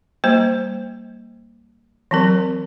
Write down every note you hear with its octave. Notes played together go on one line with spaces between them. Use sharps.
G3 A#3 C5
E3 F#3 C4 A#4